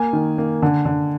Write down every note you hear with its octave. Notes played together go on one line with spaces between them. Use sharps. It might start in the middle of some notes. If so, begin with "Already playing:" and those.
Already playing: A#3 G#5
D#3
A#3
D3
D3